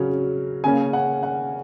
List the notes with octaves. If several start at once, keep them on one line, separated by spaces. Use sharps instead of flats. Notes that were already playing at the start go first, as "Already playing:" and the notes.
Already playing: C#3 F#3 C#4
C#3 A#3 C#4 G#5
F#5
F#5